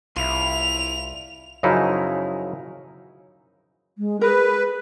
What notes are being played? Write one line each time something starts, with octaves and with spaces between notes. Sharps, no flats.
C2 E4 F4 F7
F#2 C#3 F3 F#3 D#4 E4
G#3
G#4 A#4 B4